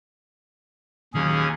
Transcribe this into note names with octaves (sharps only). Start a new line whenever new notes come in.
A#1 D#2 D#3 F#3 C#4 G#4